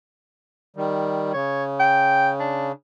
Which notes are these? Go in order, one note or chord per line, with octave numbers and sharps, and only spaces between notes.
D#3 G3
C#3 C#5
G5
D4